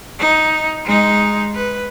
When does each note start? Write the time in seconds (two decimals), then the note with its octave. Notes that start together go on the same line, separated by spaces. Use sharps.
0.20 D#4
0.85 G#3 D#4
1.55 B4